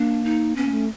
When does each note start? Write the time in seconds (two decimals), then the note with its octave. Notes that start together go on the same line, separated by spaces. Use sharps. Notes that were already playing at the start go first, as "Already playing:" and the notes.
Already playing: A#3 D4
0.24 D#4
0.56 B3 C#4
0.65 A#3
0.72 A3